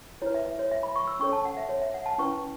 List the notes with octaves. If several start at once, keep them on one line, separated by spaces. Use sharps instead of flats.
E4 B4 C#5
E5
E5
C#5
E5
B5
C#6
E6
C#4 A4 C#5 C#6
A5
F#5
E5
C#5
E5
F#5
A5
C#4 E4 B4 C#6